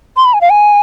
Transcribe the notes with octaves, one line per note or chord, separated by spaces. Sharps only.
C6
B5
G#5
F5
G#5